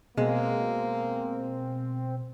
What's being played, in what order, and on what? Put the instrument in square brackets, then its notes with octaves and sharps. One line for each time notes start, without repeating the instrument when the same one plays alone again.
[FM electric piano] B2 [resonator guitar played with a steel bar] G#3 [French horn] A#3 [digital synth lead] C4